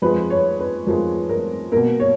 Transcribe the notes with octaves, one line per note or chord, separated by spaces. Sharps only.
F2 F3 G#3 B4
C#5
B4
F2 F3 G#3 A#4
A#4
B2 A#3 A#4
C#5